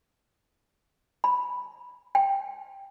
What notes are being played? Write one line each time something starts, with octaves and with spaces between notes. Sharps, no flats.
B5
G5